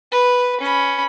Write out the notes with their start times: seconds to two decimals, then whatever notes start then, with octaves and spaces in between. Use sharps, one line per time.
0.11 B4
0.60 C#4 B5